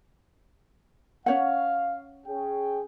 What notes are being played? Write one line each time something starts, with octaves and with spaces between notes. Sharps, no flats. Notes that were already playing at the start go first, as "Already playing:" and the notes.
C#4 C#5 F5 F#5
C#4 G#4 G5